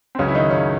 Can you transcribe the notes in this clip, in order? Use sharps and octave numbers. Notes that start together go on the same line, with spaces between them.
C4
C#2 C#3 F#3 C#4
E4
D#3 D#4
C#3 C#4